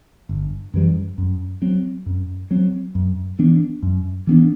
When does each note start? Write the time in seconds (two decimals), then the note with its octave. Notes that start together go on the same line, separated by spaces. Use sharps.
0.29 G1
0.74 F#2 E3 G3
1.18 F#2
1.62 F#3 C4
2.06 F#2
2.51 F#3 C4
2.95 F#2
3.39 E3 B3 D4
3.83 F#2
4.27 E3 B3 D4